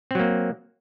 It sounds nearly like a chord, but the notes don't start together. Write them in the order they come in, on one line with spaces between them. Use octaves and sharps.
C4 F#3 A#3